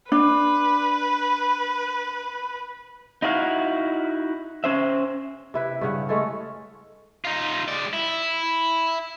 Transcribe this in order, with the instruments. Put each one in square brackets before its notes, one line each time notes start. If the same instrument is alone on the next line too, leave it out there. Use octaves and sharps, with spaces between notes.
[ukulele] D4 [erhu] B4
[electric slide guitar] D#4 E4 F#4 A4 F5
C#4 C5 E5
[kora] C3 E4 B4
G2 C#3 F#5
G#3 A3 C#4 A4
[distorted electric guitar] D#4 F4
G#3 D5
E4